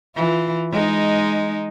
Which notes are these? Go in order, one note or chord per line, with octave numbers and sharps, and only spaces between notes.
E3 F4
G#3 D#4